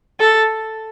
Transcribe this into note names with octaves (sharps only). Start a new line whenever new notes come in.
A4